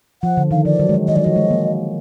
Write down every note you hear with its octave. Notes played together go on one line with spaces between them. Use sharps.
F3 F#5
D3
D#3 F5
F3 D5
F#3
G#3
F#3
D#3 D#5
F#3 D5
F3 D#5
G#3
A#3